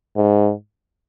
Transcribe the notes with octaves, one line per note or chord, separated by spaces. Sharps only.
G#2